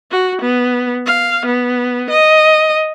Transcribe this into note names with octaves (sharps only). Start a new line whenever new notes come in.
F#4
B3
F5
B3
D#5